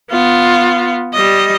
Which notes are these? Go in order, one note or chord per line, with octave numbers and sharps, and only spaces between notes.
B3 F4
G3 D#5